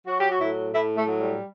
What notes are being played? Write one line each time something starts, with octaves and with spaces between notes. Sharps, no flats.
F#3 F#4
G4
F#4
A2 E4
A2 E4
A3
F#3
G3